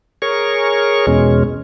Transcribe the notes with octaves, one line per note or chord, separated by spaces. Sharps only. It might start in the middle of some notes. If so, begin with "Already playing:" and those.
G#4 A#4 C#5 C#6
E2 B2 G#3 C#4